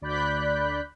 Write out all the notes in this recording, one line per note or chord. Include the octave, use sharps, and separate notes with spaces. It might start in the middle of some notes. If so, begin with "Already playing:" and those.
D2 D5 B5 F#6 G6 B6